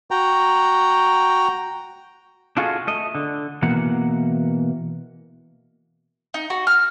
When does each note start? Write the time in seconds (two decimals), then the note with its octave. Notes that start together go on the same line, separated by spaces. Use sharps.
0.11 F#4 G5 A#5
2.57 D4 F4 F#4 G#4 A4 D#5
2.87 A3 D#5
3.15 D3
3.62 B2 E3 A#3 F#5
6.34 D#4
6.50 F#4
6.67 F6